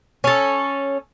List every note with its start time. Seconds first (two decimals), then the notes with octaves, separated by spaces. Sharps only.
0.24 C#4 A4